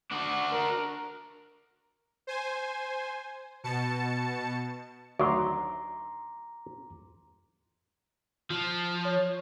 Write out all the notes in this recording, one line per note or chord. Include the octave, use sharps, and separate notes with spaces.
D4 F#4
A#4
C5 G#5
B2 A5 C#7
D2 D#3 F#3 A#5 C6 D6
F3
C#5